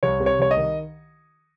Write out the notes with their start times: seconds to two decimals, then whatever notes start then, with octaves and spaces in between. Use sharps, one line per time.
0.03 C2 C#5
0.20 C3
0.26 C#5
0.39 C2 C#5
0.51 D#5
0.57 D#3